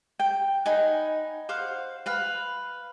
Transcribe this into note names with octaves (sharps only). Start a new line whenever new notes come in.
G5
D#4 F#5 G#5 B5
C5 F5 F#5
B4 F5 B5